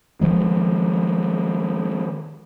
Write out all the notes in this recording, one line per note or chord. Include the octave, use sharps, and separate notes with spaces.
D#3 F3 G#3